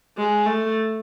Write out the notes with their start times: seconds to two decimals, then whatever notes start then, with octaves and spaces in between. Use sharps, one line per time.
0.17 G#3
0.46 A3